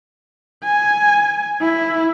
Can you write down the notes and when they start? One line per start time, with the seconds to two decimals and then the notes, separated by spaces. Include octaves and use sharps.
0.64 G#5
1.61 E4